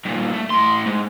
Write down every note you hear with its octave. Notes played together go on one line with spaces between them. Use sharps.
G2 A#2
A3
A2 C6
G#2